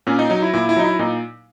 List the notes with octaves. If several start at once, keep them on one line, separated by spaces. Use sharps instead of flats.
A#2 C#4
D#4
F#3 D#4
E4
A#2 E4
E4
F#3 D#4
E4
A#2 D#4